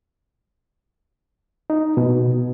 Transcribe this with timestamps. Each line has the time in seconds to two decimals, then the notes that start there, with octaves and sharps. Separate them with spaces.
1.70 D#4
1.97 B2